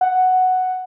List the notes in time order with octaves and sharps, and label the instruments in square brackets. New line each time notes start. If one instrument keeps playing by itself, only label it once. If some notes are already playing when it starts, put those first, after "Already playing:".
[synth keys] F#5